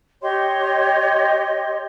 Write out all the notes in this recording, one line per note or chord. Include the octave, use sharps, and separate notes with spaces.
G4 C#5 D#5 C6